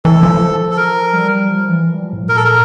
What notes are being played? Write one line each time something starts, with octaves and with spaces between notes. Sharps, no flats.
E3 A4
F3
A4
A#4
G3
F3
E3
F3
G3
F3
A2
A#2
A#4
A4
A#4